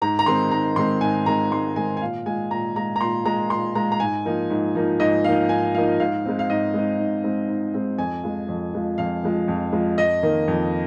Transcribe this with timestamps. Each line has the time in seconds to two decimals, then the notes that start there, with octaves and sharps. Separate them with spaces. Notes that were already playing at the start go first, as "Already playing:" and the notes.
0.02 G#2 A#5
0.19 A#5
0.26 D#3 G#3 C4 C6
0.51 G#2 A#5
0.76 D#3 G#3 C4 C6
1.01 G#2 G#5
1.26 D#3 G#3 C4 A#5
1.51 G#2 C6
1.76 D#3 G#3 C4 G#5
1.97 G#5
2.01 A#2 F5
2.26 G#3 F4 G#5
2.51 A#2 A#5
2.76 G#3 F4 A#5
2.96 A#5
3.01 A#2 C6
3.25 G#3 F4 A#5
3.50 A#2 C6
3.75 G#3 F4 A#5
3.92 A#5
4.00 G#2 G#5
4.25 F3 A#3 D#4
4.50 G#2
4.75 F3 A#3 D#4
5.00 G#2 D#5
5.24 F3 A#3 D#4 F5
5.49 G#2 G#5
5.74 F3 A#3 D#4 F5
6.00 G#2 F5
6.25 G#3 C4 D#4
6.39 F5
6.50 G#2 D#5
6.74 G#3 C4 D#4
6.99 G#2
7.24 G#3 C4 D#4
7.48 G#2
7.74 G#3 C4 D#4
7.98 F2 G#5
8.23 F3 G#3 F4
8.48 F2
8.74 F3 G#3 F4
8.98 F2 F5
9.23 F3 G#3 F4
9.48 F2
9.73 F3 G#3 F4
9.97 F2 D#5
10.23 D#3 A#3
10.48 F2